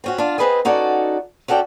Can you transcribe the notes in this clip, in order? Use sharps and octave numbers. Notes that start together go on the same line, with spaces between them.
C4 C#4 F#4
D4 F4
C4 G#4 B4 C5 D#5 G#5
C#4 D#4 F#4 A4 D5
C#4 F#4 A4 D5 G5